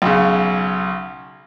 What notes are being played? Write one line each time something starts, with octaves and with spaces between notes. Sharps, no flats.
B1 C#3